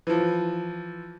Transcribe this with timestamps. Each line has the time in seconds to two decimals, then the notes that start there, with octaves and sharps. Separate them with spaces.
0.07 E3 F3